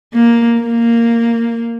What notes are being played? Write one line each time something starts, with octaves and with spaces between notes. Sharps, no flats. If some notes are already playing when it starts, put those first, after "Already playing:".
A#3
A#3